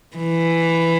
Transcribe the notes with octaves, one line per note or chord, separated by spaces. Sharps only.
E3